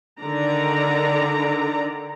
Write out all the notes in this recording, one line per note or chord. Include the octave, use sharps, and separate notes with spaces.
D3 D#3 D5 A#5